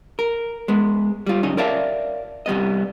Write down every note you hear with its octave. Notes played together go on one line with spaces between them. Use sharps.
A#4
G#3 B3
G3 F4
F#2 C#3 D#4 D#5
A#4 C#5 D5 E5 F5 A5
C3 G3 B3 D#5